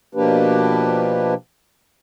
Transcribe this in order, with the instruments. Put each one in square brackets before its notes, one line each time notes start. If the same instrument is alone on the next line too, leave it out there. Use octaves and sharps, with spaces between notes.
[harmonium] B2 F3 A#3 D4 G4 B4